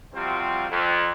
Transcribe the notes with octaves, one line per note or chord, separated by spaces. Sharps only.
C3 F3 G3 C4 F4 F#4
F2